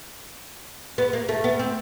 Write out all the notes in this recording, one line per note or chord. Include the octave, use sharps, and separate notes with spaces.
B3
A#3
A3
B3
C4